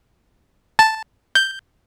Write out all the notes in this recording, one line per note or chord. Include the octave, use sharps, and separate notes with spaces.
A5
G6